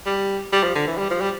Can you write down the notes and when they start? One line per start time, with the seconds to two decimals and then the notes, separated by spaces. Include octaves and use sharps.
0.06 G3
0.52 G3
0.63 F3
0.75 D3
0.87 E3
0.98 G3
1.10 F3
1.21 G3